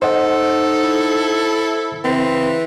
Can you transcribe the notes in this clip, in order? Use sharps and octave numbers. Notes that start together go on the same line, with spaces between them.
D#4 A4 C5 D#5 F#5
E4
C#3 E3 C4